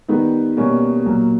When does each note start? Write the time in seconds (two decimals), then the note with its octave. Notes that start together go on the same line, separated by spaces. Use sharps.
0.08 D#3 G3 B3 D#4
0.57 B2 G3 A#3 C#4
1.04 A#2 F#3 A#3